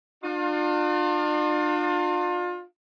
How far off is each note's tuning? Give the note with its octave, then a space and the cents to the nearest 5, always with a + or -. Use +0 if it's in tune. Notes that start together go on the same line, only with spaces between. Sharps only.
D4 +45 F4 +30